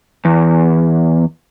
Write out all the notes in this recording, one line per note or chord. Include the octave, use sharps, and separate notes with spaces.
E2